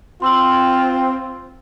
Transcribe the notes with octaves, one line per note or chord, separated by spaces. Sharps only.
C4 F4 C6 E6 F#7